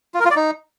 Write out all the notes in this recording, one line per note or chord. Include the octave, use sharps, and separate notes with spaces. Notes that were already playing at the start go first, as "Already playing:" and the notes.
F4
A#4
F4
D5
D#4